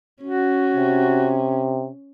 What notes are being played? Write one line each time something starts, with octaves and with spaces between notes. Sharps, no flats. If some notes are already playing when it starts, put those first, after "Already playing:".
C#4 F#4
C3